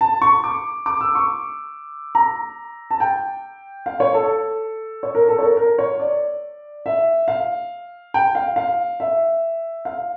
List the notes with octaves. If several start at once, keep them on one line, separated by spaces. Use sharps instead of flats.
A5
C#6
D6
D6
E6
C#6
A#5
A5
G5
F5
C#5
A4
C#5
A#4
A4
C#5
A#4
A#4
C#5
D5
E5
F5
G5
F5
F5
E5
F5